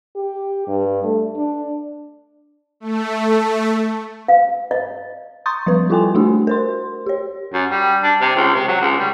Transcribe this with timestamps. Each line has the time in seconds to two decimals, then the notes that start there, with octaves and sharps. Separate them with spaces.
0.16 G4
0.68 G2
1.04 A3
1.36 D4
2.80 A3
4.28 F5
4.71 D#5
5.46 A#5 C6 C#6 D#6 G6 A6
5.67 F3 G3 B4
5.90 E4 F4 A4 G5 G#5 C6
6.15 A3 D4 F#4 G4
6.47 A#4 C5 C6
7.06 G4 C#5
7.53 F#2
7.71 G3
8.03 D4
8.21 C3
8.36 C#2
8.54 C3
8.68 F#3
8.81 C#2
8.99 G3